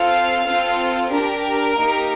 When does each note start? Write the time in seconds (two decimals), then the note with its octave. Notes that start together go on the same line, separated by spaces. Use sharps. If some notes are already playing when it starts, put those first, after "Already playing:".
Already playing: C4 F4 A4 F5
0.45 C4 F4 A4
1.10 D4 G4 A#4
1.76 A#3 D#4 G4